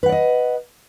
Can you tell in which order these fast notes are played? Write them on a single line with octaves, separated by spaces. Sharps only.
B4 F#5 D5 D#5